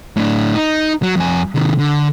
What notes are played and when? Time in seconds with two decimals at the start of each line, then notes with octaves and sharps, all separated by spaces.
0.16 A2 D4
0.55 D#4
1.03 F#3
1.16 F2 G#5
1.55 C3 D#3
1.79 D3